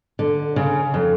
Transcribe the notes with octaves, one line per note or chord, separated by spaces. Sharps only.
D3
C#3
F2